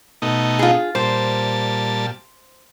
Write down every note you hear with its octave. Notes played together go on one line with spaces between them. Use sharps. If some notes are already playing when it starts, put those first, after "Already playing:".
B2 A3 D#4
F4 G#4
A#2 G3 C5 A5